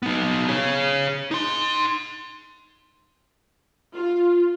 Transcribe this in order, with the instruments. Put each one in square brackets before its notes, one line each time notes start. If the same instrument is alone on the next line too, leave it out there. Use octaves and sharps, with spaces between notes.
[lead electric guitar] B3 D#4
G#4 C#5
D#4 C6
[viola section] F4